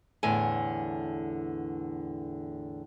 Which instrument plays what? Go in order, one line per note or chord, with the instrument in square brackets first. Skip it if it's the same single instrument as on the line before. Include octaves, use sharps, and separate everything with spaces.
[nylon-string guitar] E2 A2 D3 G#5